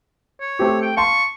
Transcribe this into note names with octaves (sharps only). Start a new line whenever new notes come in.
C#5
A3 C4 G4
G5
F5 A5 C6 C#6